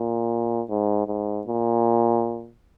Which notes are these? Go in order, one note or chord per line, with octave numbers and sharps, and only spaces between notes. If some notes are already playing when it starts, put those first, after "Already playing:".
Already playing: A#2
G#2
G#2
A#2